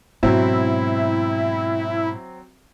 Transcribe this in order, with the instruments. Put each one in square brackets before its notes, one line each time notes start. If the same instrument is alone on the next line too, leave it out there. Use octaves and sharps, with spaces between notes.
[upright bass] G#2 B2 [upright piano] F#3 C4 [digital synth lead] E4